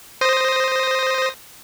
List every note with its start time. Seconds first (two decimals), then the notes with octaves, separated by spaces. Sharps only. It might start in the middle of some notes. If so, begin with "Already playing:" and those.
0.21 C5 D#6 A#6